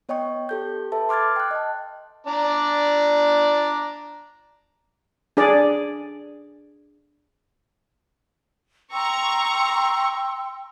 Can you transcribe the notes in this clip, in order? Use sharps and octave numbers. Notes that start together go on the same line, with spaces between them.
B3 C#5 D#5 G5 C#6
G4 A4 G6
A4 B4 E5 A5
C6 D6 F6 G#6 A6
G5 F#6
D#5 A5
D4 D5 A#5
D4 G#4 D5
G5 A#5 C6 C#6 E6